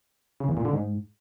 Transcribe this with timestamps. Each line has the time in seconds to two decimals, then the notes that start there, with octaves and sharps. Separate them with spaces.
0.40 C#3
0.49 E2
0.57 A#2
0.65 D3
0.73 G#2